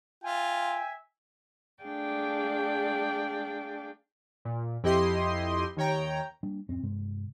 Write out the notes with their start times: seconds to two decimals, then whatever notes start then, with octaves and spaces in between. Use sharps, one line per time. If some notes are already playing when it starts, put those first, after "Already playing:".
0.24 F4 E5 G5 G#5
1.83 A3 D4 G#4 D5 F5 G5
4.45 A#2
4.83 F2 E4 G4 D#5 C6
5.76 D#2 D#3 C#5 G5 A#5
6.43 G3 A#3 D4
6.68 D1 F2 C4 C#4
6.83 G2 C3 G#3